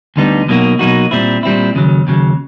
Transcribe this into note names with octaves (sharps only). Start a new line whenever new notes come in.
D2 D3 G3 B3 D#4
B2 F#3 A#3 D#4 F#4
B2 F#3 A#3 D#4 F#4
A#2 G3 C4 E4
A#2 G3 C4 E4
D#2 C#3 F#3
D#2 C#3 F#3